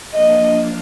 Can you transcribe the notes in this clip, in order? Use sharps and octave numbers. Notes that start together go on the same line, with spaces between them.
F3 A#3 D4 F4 D#5